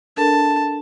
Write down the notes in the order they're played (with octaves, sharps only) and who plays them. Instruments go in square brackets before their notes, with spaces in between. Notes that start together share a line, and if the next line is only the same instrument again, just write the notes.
[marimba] D4 A4 A#4 [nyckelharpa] A5